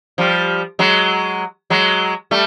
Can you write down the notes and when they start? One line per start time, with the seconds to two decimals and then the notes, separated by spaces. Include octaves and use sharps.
0.18 F3 G3
0.79 F#3 G#3
1.70 F#3 G#3
2.31 G3 A3